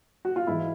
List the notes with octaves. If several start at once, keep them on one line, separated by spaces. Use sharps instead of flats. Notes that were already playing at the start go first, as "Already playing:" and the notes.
F#4
F4
G#2 E3 E4